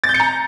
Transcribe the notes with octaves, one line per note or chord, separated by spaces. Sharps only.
A6
G6
C#7
A#5